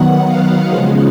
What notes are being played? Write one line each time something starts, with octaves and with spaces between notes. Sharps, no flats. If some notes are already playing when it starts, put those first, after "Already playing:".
Already playing: D#3 F#3 B3 F#5
F5
C#3 F3 G#3